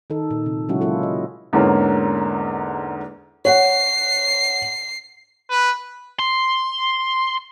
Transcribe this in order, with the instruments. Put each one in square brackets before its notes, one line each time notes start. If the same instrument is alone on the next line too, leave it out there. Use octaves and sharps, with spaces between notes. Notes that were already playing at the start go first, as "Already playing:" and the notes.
[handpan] D#3 D#4 A4
A#2
C3
C#3 F#3 G#3 C#4 E4 F#4
F#3 A#3 E4 F4 A4
D#5
[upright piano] E2 G#2 D3 A#3 C#4
[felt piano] C#5 F#5 [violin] C7
[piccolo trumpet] B4
[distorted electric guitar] C6